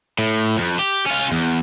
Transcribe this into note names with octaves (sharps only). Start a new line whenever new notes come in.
A2
F2
G4
C#4 F4
E2